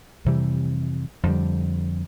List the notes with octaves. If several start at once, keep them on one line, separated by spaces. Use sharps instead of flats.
F2 C3 E3 G3
F2 D3 G3